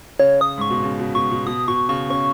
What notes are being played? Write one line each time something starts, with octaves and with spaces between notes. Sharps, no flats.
C#3 C#5
D#6
G#2 C#6
B2
C#3
B2
B2 C#6
B2
B2 D#6
B2 C#6
C#3 C#6
C#4 C#6